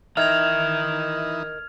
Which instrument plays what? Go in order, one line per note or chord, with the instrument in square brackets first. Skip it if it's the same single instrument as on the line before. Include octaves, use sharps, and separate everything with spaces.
[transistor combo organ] E3 D#4 [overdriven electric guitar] A#4 D#5 [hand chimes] E5 [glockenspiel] F6 G#6 F7